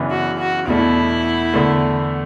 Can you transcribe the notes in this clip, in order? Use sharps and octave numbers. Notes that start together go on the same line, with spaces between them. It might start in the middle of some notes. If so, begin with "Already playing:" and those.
Already playing: F#2 C#3 E3 B3 D4
F#4
F#4
E2 B2 A3 D4 E4
E2 D3 A3